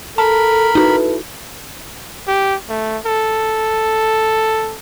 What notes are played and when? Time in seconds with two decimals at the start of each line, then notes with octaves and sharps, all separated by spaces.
0.18 A4 A#4 A5 B5
0.75 D#4 E4 F#4 A4 B4
2.28 G4
2.69 A3
3.06 A4